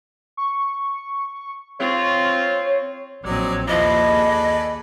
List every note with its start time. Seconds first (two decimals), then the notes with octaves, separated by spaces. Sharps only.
0.37 C#6
1.79 C4 F4 C#5
3.25 A#1 F#3 C4 D5 D#5
3.68 D#2 F3 E4 A4 B4 D5 D#5
4.06 G#4